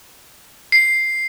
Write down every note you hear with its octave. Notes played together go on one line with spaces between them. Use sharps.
C7